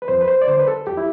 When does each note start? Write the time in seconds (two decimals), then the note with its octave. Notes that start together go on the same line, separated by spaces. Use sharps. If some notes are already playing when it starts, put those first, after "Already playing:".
0.02 B4
0.08 F2 C5
0.21 B4
0.28 C5
0.42 D5
0.47 D3 C5
0.59 B4
0.67 A4
0.86 F2 G4
0.97 E4